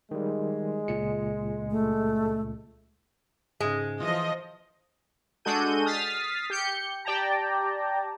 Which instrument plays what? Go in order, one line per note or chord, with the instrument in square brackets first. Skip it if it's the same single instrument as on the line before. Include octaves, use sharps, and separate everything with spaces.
[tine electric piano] D#3 G3 [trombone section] G#3
[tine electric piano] C#2 A#2 C#7
[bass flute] A3
[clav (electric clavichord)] G#2 C#3 [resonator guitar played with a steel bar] G#3
[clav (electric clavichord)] E3 F4 [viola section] F3 D#5
[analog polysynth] G#3 D4 F#4 A4 G6 D#7
D#6 F6 A6 B6 C7
G4 G6 C#7
G4 D5 G5 A5 A#5